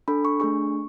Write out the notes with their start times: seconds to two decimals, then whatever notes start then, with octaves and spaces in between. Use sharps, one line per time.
0.08 D4 A4 B5
0.25 C#6
0.40 A3 D4 G#4 C#6